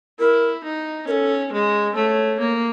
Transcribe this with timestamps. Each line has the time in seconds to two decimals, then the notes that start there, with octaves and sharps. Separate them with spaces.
0.19 E4 A#4
0.64 D#4
1.07 C#4 A#4
1.11 A4
1.52 G#3
1.95 A3 C#5
2.39 A#3